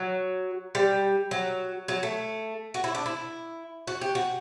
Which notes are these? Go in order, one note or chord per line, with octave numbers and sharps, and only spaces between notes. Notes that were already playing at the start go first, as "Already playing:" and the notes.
Already playing: F#3
G3
F#3
F#3
A3
F#4
E4
D4
E4
F#4
G4
F#4